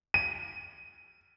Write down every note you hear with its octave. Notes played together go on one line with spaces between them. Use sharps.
D#7